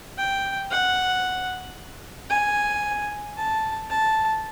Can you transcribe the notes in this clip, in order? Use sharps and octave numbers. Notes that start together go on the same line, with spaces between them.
G5
F#5
G#5
A5
A5